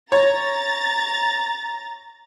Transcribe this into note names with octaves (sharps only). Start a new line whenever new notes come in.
C#5 A#5 A6